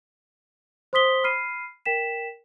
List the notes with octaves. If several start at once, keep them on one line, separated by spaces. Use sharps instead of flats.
C5 C6 D#6 B6 G7
B5 F6 C7 D#7
A#4 G5 B6 E7